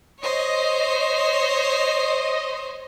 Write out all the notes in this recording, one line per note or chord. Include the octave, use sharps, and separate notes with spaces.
C5 C#5 D#5